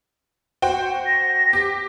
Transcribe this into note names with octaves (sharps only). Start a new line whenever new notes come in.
F#4 C5 G5
A#6
G4